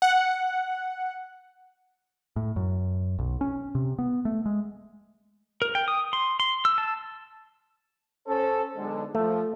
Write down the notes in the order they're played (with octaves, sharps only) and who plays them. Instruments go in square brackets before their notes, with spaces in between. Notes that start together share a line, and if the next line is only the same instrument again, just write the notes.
[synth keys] F#5
[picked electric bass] A2
F#2
B1
C#4
C3
B3
A3
G#3
[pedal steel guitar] A#4
G5
D#6
C6
C6
E6
A5
[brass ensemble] C#4 A4 C5
B1 D3 G#3
[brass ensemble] F3 [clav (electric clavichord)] A3